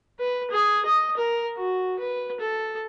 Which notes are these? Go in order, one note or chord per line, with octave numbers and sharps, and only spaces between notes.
B4
G#4
D#5
A#4
F#4
B4
A4